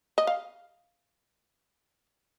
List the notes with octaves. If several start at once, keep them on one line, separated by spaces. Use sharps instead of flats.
D#5
F5